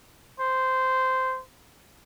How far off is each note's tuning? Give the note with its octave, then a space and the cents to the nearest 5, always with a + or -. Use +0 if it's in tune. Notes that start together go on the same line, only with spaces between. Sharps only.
C5 -10